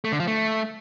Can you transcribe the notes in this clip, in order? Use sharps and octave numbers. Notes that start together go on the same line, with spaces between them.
A3
D3
F3
A3